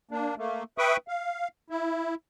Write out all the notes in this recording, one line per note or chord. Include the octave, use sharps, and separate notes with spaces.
A#3 D4
A3 A#3
B4 E5 G5 B5 C#6 D#6
F5
E4